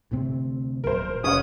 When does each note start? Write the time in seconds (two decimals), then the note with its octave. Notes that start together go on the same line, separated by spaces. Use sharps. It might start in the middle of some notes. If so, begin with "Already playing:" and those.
0.11 D2 C3 C4
0.84 D#1 B1 F#3 A#4 C5
1.24 F1 C#4 C#5 F#5 D#6